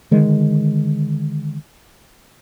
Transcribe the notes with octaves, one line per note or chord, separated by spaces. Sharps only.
D3 D#3 G#3